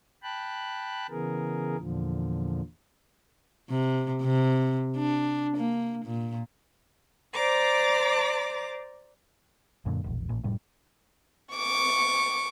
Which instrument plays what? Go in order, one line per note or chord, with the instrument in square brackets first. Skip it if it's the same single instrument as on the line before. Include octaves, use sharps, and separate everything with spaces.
[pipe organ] G5 A5 B5 F#6
C#3 E3 B3 G#4 A#4
E2 A#2 D3 F3
[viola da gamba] C3
C3
D4
A#3
A#2
[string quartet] C5 D5 A#5 D6
[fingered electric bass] F#2 A#2 D3
E1 A#1
A1 A#2
F1 A2 G3
[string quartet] C#6 D6